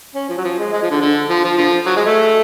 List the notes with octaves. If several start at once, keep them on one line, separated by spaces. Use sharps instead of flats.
C#4
F3
F#3
F3
G#3
G#3
F3
D3
D3
F3
F3
D3 F3
F#3
G#3
A3